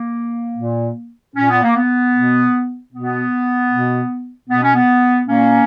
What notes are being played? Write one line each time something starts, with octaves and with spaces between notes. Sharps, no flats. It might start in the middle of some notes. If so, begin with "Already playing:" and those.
Already playing: A#3
A#2
A#2 C#4
B3
A#3
B3
B2
B2 B3
B2
B2 B3
C#4
B3
A#2 A#3 C#4